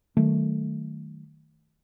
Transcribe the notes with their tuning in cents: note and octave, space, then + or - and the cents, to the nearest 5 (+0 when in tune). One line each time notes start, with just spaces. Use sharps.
D#3 +0 F#3 +35 A3 +0